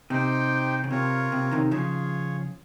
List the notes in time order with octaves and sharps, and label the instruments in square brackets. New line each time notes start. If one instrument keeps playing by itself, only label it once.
[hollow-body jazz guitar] C3 [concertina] D#4 G4 C5 G5
[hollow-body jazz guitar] C#3
[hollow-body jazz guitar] C3 [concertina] F4 A#4 C#5
[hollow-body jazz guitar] C3
C3 D#3
[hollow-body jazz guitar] C#3 F3 [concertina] F4 G#4 C#5